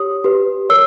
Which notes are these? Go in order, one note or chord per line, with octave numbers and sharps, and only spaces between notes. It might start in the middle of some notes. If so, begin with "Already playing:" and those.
Already playing: G4 C#5 D#6
G4 B4
A#4 C#5 E6